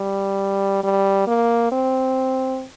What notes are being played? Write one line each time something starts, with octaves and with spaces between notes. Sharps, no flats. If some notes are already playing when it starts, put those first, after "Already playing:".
Already playing: G3
G3
A#3
C4